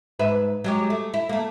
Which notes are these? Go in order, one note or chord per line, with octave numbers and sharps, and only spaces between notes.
G#2 B4 E5
F#3 G#3 G4
A3
E4
A3 A#3